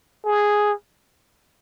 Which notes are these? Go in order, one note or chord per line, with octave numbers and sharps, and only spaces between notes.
G#4